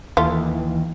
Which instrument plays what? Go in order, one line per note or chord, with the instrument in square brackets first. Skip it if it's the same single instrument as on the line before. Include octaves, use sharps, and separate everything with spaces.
[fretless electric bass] D#2 [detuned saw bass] E3 [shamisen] A3 F4